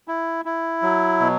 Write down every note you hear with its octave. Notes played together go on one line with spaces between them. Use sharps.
E4
E4
F#3
B2